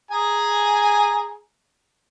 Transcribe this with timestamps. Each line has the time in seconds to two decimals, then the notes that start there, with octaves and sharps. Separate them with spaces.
0.11 G#4 G#5 A#5